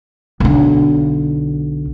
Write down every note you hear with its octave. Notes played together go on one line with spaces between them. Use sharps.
B1 D3